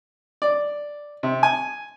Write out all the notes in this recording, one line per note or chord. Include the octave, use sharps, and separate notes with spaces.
D5
C3
G#5